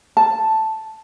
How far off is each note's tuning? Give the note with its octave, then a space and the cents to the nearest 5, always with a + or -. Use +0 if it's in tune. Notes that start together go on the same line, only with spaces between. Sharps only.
A5 +0